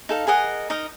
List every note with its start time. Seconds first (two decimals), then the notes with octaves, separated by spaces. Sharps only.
0.09 D#4 A4 F5
0.27 G#4 A#4 D#5 F#5
0.70 D#4 A#4 D#5